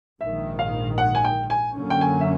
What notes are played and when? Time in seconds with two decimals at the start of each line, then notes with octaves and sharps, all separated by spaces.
0.20 A#1 G#2 D#3 E5
0.59 F5
0.98 F#5
1.15 G#5
1.24 G5
1.50 G#5
1.75 F#2 D3 F#3 A#3 C#4
1.90 G5
2.01 G#5
2.21 E5